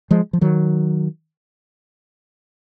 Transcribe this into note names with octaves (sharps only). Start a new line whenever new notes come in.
F3 G#3
F3
D#3 F#3